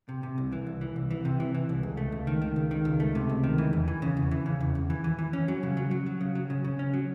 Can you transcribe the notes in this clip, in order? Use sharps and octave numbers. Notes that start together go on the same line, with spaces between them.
C3
C3
C2
E3
C2
E3
C2
E3
C3
E3
E3
C2
C#2
A3
C#2
D#3
D#3
C#2
D#3
C#2
A3
C3
C#2
D#3
E3
E2
E3
C#3
E2
E3
C#3
E2
E2
E3
E3
E3
C#4
F#3
C#3
F#3
F#3
F#3
C#3
F#3
C#3
C#3
C#4
F#3